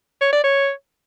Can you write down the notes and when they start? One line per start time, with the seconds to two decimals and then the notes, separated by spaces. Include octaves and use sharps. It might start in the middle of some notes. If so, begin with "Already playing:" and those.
0.21 C#5
0.33 D5
0.44 C#5